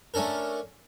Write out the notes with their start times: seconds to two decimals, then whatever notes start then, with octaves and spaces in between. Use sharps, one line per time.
0.14 A3 C#4 D4 A4 A#4